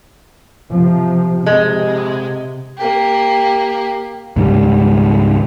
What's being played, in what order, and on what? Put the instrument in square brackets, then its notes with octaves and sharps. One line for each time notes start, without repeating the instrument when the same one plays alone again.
[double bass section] C3 F3
[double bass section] C3 [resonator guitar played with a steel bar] G#3
[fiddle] A#3 G4
[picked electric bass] C#2 G#2 D#3 G3